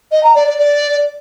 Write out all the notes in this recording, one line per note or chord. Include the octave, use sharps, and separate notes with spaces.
D#5
A#5
D5
D5
D5